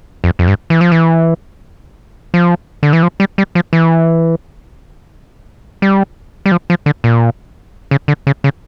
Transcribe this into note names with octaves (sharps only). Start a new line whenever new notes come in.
F2
F2
G2
E3
F3
E3
F3
D3
E3
F3
G3
G3
F3
E3
G3
G3
F3
F3
D3
A#2
C#3
D3
C#3
C#3